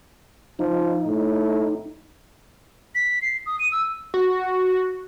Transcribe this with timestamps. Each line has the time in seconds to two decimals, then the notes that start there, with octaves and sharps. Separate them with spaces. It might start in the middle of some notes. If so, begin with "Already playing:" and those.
0.59 F3 D#4
1.06 A2
2.95 B6
3.22 C7
3.46 D#6
3.60 D#7
3.72 E6
4.14 F#4